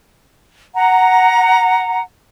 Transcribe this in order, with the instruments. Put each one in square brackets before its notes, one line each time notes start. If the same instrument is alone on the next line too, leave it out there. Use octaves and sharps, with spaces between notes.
[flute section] F#5 A#5